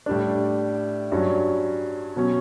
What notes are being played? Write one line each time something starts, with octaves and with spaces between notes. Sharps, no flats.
A2 G3 D4
G2 F#3 C#4
B2 F#3 C#4